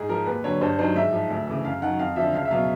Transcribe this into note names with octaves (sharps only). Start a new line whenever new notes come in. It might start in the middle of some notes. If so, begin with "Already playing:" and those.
Already playing: G#2 G#4
F3 A#4
D#2 B4
D3 F#3 C#5
G2 C5
D#3 F#3 C5
G#2 E5
F3
D2
C#3 E3
F#2 F5
D#3 F#3 F#5
F2 F5
D3 F3 E5
C#2 F5
E5
B2 F#3 F5